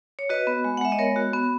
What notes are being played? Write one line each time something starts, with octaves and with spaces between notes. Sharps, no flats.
C#5
F#4 B4 D#5
B3
G#3
F#5
G#3 E5
D#5
B3 A#4 C#5
F#4
B3